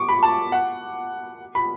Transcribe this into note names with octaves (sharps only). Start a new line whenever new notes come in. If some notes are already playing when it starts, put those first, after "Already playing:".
Already playing: C#6 D6
B5
A5
F#5
B5